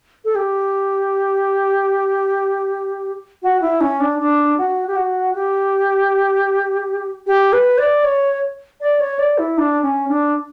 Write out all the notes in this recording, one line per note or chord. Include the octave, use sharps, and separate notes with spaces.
A4
G4
F#4
E4
C#4
D4
D4
F#4
G4
F#4
G4
G4
B4
D5
C#5
D5
C#5
D5
E4
D4
C#4
D4